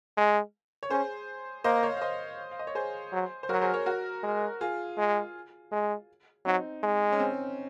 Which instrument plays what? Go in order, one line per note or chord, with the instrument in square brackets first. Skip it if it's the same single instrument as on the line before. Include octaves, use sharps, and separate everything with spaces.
[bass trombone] G#3
[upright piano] C#5
[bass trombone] C#4 [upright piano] G#4 C5
[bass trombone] A#3 [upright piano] C5 D#5
[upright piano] C#5 F5
F5
C5 D#5
F5
D#5
C#5
G#4 C5
[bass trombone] F#3
[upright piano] C5
[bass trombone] F#3 [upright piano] F#4 A#4
[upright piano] G#4 C5
A#4 C#5
F#4 A#4
[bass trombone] G#3
[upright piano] F4 G#4
[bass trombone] G#3
G#3
[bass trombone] F#3 [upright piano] C4 D#4
[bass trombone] G#3
[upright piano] C#4
C4